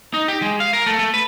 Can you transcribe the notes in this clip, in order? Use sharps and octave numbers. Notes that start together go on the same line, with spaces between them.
D#4
G4
G#3
F5
A#4
A3
A3
B4